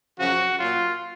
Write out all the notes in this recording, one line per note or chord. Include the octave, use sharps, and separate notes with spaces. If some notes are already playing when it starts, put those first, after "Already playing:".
F#2 C#3 F3 F#4
A#2 F#3 F4